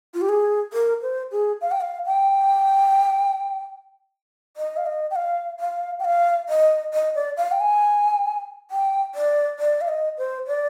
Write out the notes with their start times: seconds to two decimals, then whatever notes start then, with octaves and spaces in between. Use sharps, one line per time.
0.14 F4
0.21 G4
0.29 G#4
0.73 A#4
1.02 C5
1.32 G#4
1.61 F5
1.71 G5
1.81 F5
2.06 G5
4.57 D#5
4.77 F5
4.86 D#5
5.11 G5
5.16 F5
5.60 F5
5.99 G5
6.05 F5
6.49 D#5
6.94 D#5
7.15 D5
7.37 F5
7.52 G5
7.60 G#5
8.71 G5
9.15 D5
9.59 D5
9.81 F5
9.88 D#5
10.18 C5
10.47 D5